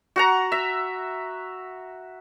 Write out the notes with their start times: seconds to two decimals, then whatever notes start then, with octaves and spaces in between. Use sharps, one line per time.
0.16 F#4 F#5 A#5
0.52 E5